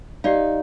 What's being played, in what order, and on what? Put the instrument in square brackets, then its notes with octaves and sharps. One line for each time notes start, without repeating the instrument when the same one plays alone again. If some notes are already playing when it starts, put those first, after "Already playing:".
[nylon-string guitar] D#4 [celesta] G4 D5 F5